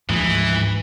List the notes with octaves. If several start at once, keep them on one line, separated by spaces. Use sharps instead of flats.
D2 G#2 E3 F3